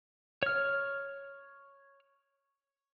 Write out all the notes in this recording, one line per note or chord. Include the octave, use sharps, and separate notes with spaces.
C#5 F6